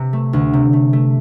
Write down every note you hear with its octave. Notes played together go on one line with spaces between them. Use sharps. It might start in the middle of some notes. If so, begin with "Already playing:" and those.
Already playing: C3
A3
D2
C3
A3
A3